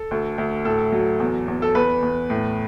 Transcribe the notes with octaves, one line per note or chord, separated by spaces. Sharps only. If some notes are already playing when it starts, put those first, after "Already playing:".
Already playing: A4
D2
D2
A2 A4
F#3
E2
E2
A4
E2 B4
E2
A2